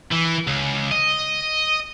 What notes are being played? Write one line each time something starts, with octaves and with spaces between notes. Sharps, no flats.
E3
C#2
D#5